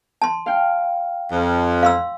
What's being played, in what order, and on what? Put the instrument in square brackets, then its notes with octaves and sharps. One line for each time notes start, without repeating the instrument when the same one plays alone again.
[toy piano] A5 C6
[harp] F5 G5
[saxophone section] F2
[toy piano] F5 C6 E6